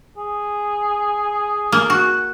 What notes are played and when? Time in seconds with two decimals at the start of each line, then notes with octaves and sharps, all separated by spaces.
0.18 G#4
1.72 A#3
1.90 F#4